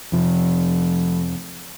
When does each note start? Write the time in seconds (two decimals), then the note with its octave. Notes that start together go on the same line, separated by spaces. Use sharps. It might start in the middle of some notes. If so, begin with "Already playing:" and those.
0.12 F2 C3 F3